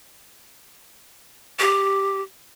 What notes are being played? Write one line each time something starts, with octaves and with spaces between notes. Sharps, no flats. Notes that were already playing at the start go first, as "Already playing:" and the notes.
G4